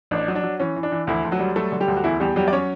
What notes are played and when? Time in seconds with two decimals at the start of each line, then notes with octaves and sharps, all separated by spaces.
0.11 A1 D4
0.28 F#3
0.36 D4
0.43 F#3
0.60 E3 C#4
0.76 E3
0.83 D4
0.92 E3
1.07 D2 E3 E4
1.25 D2
1.31 F#3 F#4
1.39 G3
1.56 F#3 A3 A4
1.72 D3
1.80 G3 G4
1.88 D2
1.97 F#4
2.04 E2 E3 E4
2.20 E2 G3 G4
2.36 F#3 G3 G4
2.48 D5
2.53 C#4 C#5